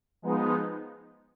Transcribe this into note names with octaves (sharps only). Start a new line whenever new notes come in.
F3 G#3 B3 D#4